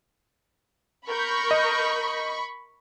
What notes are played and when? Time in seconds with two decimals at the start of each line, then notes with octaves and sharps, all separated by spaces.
1.08 A#4 B5 C#6 G6
1.51 D#5